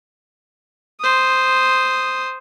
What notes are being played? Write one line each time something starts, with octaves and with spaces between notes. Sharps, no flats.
C5 D#6